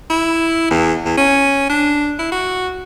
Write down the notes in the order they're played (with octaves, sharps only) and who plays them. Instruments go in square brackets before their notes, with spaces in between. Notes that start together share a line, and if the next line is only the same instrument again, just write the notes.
[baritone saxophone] E4
E2
E2
C#4
D4
E4
F#4